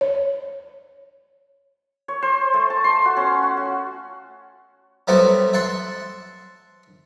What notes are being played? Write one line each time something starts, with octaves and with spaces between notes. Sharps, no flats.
C#5
C#5
C5
A3
A5
C6
F#4
C#4
F#4
F#4
F#3 G3 A3 B3 C4 F#4
E5 F#5 A5 C6